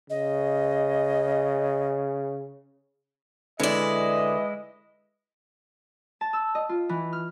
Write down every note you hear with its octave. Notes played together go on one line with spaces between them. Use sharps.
C#3 D#5
D3 E3 G#3 E4 D5 D#5
A5
E6
D#5
F4
E3
F6